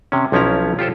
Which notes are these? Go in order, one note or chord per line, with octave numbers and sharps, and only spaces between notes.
C3 C#4
B1 F3 C#4 E4 A#5
F4 G4 A4 C5